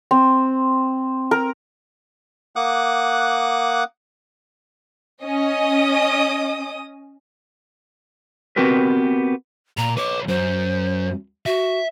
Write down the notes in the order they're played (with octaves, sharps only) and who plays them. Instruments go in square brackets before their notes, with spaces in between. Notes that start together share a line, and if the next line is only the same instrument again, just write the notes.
[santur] C4
A#4
[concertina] A#3 F#5 D6 D#6 F#6
[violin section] C#4 D#5 D#6
[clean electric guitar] B3 C4 F#4 G4 A#4 B4
[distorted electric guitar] A#2 [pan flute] A#5
[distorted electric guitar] B4 C#5 [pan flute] D6
[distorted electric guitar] F#2 [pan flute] C5
[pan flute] F#4 [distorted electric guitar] E5